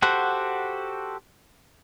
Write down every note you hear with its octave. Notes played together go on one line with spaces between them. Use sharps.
F#4 G4 A4 C5 F#5